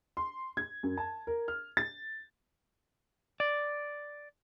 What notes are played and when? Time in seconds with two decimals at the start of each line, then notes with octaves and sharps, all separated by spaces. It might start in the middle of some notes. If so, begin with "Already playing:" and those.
0.17 C6
0.57 G#6
0.83 F#2
0.97 A5
1.27 A#4
1.48 F6
1.77 A6
3.40 D5